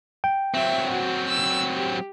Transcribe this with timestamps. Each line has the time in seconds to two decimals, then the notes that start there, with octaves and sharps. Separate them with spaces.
0.24 G5
0.54 F#3 C4 E5
0.90 F#4
1.29 E6
1.74 G4